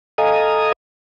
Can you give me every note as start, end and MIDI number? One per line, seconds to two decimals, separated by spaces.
0.18 0.72 69
0.18 0.72 75
0.18 0.72 77
0.18 0.72 80
0.18 0.72 82
0.18 0.72 87